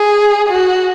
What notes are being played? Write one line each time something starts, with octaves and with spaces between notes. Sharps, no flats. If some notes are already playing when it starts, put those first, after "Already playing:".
Already playing: G#4
F#4